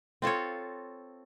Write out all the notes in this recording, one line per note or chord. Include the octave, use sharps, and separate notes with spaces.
C4 F4 A4 C#5